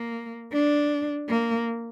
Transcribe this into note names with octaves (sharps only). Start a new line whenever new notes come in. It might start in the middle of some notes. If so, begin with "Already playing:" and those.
Already playing: A#3
D4
A#3